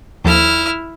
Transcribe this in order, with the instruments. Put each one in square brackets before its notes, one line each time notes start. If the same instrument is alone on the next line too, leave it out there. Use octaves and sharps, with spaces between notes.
[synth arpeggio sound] D#2 F3 A4 [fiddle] E4 F6